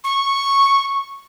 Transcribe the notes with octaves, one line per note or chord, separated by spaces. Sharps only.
C#6